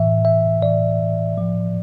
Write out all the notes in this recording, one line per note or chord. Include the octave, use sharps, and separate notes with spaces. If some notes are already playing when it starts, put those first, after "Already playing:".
Already playing: A2 E3 E5
E5
A2 E3 D5
A2 F3